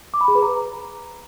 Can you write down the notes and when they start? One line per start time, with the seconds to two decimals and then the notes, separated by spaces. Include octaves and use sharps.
0.14 D6
0.21 B5
0.28 G#4
0.35 B4
0.43 A#5